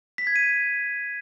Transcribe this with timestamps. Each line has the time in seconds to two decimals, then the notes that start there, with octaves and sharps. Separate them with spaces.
0.18 B6
0.27 G#6
0.36 D#7